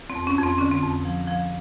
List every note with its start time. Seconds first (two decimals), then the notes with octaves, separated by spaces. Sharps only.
0.10 C4
0.15 F2
0.27 C#4
0.38 F2
0.43 C4
0.58 D3 C#4
0.71 C4
0.83 F2
1.05 F3
1.27 F3